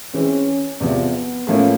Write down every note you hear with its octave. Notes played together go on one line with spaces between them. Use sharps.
E3 G#3 C4 C#4
E2 C3 F3 B3
A2 F3 A#3 C#4 E4